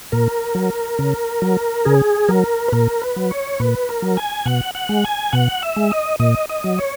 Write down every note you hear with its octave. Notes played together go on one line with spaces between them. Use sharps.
A#2 A#4
F#3
C#3
F#3
C#3 G#4
F#3 A#4
B4
A#2 A#4
B4
F#3
C#5
A#2 B4
A#4
F#3
G#5
B2 F#5
F#5
G#3
G#5
B2 F#5
E5
G#3
D#5
A#2 D#5
D#5
F#3
C#5